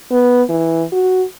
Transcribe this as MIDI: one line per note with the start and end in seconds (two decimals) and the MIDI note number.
0.11 0.42 59
0.49 0.83 52
0.92 1.24 66